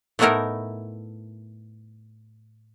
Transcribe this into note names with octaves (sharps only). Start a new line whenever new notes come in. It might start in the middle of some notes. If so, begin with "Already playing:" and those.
A2 A3 B3 D#4 E4 A#4